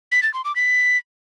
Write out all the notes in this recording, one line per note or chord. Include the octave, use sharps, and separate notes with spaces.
B6
A6
C6
D6
B6